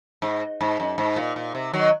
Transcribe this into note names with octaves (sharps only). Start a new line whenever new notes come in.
G#2
G#2
F#2
G#2
A#2
A#2
C3
D#3 F#3